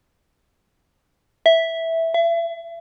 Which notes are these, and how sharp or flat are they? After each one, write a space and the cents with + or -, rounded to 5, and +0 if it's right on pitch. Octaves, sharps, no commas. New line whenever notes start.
E5 -5
E5 +35